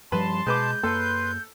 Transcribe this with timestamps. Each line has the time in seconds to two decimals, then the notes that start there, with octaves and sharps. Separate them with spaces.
0.12 G2 F3 G3 B4 A5 B5 C6
0.47 B2 G#3 B4 D6 G6
0.83 F#2 A#3 A4 B4 C6